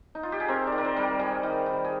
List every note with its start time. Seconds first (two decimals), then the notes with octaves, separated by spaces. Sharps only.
0.15 D#4
0.23 F4
0.32 G4
0.40 G#4
0.48 C4 A#4
0.67 D#3 D5
0.78 A#4
0.85 C5
0.97 G3 A#4
1.19 G3 G#4
1.43 D#3
1.66 D#3
1.85 G#4